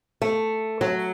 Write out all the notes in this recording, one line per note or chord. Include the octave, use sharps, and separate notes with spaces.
A3
F#3